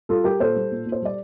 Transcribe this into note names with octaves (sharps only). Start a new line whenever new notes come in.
G3 F4 A4
G3 G4 A#4
A#2 A4 C5
G3
A#2
A#2
C5
G3 D5